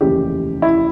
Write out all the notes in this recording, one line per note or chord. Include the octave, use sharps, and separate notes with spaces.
F1 D#2 C#3 E3 G4
E4